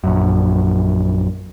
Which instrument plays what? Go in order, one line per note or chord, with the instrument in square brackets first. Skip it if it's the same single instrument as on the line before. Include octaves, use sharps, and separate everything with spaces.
[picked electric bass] A#1 F#2